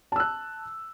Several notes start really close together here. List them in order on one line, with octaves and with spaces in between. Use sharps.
A5 E6 F#6